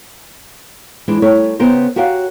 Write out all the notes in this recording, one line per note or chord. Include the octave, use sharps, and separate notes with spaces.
E3 G#3 D4
G3 A3 A#4 C#5
C#3 B3 G4 A#4 C5
F#4 G4 A#4 C#5 F5 F#5